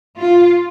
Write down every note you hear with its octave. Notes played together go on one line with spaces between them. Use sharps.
F4